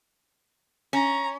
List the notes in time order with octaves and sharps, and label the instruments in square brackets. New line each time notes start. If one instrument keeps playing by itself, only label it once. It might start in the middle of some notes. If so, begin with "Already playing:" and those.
[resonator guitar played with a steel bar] C#4 [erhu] A#5